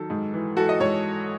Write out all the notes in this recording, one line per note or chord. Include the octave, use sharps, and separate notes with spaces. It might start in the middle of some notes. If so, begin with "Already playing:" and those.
Already playing: D#3 F#3 A4
G#2
E3
E3 F#4 A4
D#5
G#2 C#5